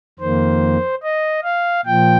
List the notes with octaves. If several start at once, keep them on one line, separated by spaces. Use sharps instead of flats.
F2 D#3 A#3 C5
D#5
F5
A#2 F3 G5